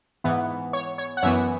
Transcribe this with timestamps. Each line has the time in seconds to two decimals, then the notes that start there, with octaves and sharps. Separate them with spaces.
0.24 G#2 E3 B3
0.73 C#5
0.98 C#5
1.17 F#5
1.23 F#2 E3 B3 C#5 E5